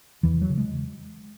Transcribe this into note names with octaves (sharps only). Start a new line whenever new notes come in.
E2 E3
F#3
C#3
G#3